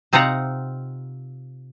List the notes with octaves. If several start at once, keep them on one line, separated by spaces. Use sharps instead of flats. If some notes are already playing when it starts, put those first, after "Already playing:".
C3 C4 D#4 F4 F#5 A#5